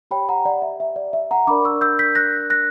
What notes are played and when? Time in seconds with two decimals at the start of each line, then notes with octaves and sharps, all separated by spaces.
0.11 G4 C#5 G5 B5
0.29 F#5 A#5
0.45 D5 F#5
0.62 E5
0.80 E5
0.96 D5
1.13 E5
1.31 F#5 A#5
1.47 D4 A#4 D5 B5 D6
1.64 C#6 E6
1.81 E6 G6
1.99 G6 B6
2.15 F#6 A#6
2.50 F#6 A#6